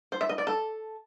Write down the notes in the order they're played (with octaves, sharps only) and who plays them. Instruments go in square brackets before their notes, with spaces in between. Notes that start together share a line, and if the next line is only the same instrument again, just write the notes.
[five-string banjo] C5
E5
D#5
D5
A4